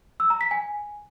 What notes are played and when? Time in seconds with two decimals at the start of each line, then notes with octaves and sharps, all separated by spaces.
0.20 E6
0.30 A#5
0.41 B6
0.51 G#5